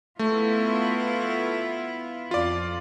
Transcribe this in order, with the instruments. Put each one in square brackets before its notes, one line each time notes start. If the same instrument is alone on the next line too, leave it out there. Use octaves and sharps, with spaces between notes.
[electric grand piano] A3 [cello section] B3 E4 F4
[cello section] F2 [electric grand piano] F4 D5